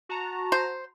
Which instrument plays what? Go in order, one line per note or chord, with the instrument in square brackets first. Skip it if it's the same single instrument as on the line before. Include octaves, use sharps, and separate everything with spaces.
[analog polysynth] F#4 A5 A#5
[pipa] C5